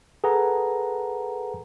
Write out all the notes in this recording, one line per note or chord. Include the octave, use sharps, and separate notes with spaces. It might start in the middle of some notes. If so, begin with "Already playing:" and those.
G#4 A4 B4 F#5 A#5